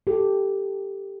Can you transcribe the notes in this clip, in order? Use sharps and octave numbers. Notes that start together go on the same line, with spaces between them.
G4 A4